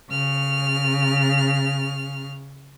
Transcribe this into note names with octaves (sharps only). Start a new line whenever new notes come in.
C#3 F6